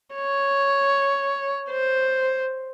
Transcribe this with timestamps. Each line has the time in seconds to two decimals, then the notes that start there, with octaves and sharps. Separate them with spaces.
0.15 C#5
1.70 C5